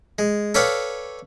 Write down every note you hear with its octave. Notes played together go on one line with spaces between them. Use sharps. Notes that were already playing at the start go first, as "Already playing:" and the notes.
G#3
A4 B4 C#5 D5 F5 G5